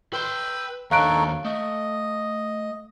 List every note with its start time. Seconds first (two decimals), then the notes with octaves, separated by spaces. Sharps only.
0.13 B4 G5 C6 E6
0.91 D#2 D4 D#4 A4 C#5 F5 F#6 D7
1.45 A3 D#5